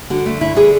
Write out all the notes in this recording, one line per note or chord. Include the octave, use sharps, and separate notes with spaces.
D3 F#4
A3
D3 E4
D3 G#4 B4